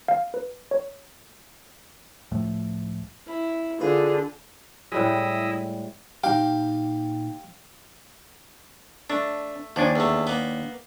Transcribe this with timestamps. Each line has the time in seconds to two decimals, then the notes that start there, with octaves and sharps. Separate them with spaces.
0.08 F5
0.34 B4
0.71 C#5
2.31 C#2 A2 F3 A3
3.27 E4
3.81 D3 F4 G#4 B4
4.92 A2 G3 G#3 E4 D#5
6.24 A#2 D#4 G4 F5 G5
9.10 A3 D4
9.76 D#2 F3 D4 G#5
9.96 E2 A3
10.27 A#3 B3